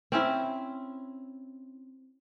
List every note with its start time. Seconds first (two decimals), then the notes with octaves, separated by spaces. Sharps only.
0.12 C4 C#4 E4